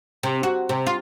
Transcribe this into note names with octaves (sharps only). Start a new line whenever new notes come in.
C3
F#4
C3
F4